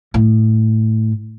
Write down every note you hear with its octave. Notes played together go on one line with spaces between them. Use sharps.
A2